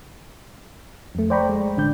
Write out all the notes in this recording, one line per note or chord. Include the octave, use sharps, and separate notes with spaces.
F2 A3
C5 D5 G5 A#5 B5 C#6
G#3
A1 D3 D4 D5 G6